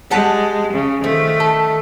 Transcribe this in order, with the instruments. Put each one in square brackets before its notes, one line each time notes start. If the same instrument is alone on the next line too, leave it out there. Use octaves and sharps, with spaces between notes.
[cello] G#3 [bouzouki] G4 F#5 A5
[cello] C#3
[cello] D#3 A3 [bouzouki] F3
[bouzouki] A4